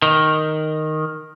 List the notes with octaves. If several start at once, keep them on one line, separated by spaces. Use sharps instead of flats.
D#3